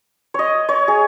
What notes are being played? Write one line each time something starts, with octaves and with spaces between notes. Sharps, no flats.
C#5 D#5
C#5
G#4